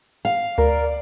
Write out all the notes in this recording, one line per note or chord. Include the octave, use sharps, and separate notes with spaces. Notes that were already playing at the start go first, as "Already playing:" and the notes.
F5
D2 A#4 D5